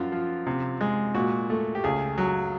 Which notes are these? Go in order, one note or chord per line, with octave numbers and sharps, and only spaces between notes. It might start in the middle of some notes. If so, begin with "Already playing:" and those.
Already playing: F#2 F3 F4
F3
C3
G#3
A#2 F#4
A3
G4
C#2 G#4
F#3